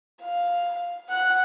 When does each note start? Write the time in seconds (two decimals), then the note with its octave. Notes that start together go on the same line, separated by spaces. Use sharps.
0.22 F5
1.09 F#5 F#6